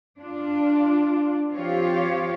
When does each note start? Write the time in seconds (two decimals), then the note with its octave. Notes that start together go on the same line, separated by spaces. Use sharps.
0.20 D4 F4
1.52 F3 C4 F4 G4 C#5 F5